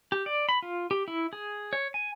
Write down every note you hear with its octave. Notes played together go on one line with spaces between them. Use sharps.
G4
D5
B5
F4
G4
E4
G#4
C#5
G#5